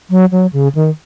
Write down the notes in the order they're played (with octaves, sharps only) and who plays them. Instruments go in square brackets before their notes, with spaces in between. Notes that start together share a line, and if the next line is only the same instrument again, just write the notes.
[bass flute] F#3
F#3
C#3
D#3